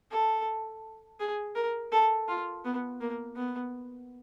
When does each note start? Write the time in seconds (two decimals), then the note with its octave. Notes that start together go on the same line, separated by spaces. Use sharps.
0.11 A4
1.20 G#4
1.55 A#4
1.92 A4
2.28 F4
2.65 B3
3.00 A#3
3.36 B3